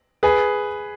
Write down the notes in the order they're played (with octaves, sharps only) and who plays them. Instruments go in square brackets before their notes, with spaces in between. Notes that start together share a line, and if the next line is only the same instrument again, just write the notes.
[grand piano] G#4 B4